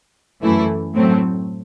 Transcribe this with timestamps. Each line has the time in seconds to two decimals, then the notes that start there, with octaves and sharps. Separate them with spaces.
0.43 F#2 E3 A3 E4
0.95 A2 F#3 A3 C4